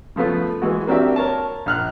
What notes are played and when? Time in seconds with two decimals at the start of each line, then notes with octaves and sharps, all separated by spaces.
0.16 C#3 F3 A3 B3 F4
0.62 E3 G#3 F#4
0.87 A#3 C4 D4 F#4 G4 E5
1.16 A#4 C#5 A5
1.66 A#1 F6 F#6